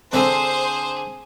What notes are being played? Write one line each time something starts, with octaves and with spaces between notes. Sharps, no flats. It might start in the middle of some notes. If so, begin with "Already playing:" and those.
D3 C4 G#4 A4 C5